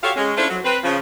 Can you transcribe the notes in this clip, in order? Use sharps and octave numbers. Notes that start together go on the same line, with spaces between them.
F#4 G4 A4 C#5 F5
G#3 C#4
C#4 D4 E4 F4 A4 C5
F#3
C4 B4
C#3 F3